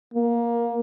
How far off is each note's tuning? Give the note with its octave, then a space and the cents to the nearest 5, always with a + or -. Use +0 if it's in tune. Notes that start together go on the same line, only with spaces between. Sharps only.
A#3 +15